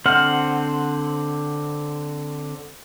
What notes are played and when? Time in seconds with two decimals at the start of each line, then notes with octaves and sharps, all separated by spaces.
0.06 D3 C4 C5 F#5 F6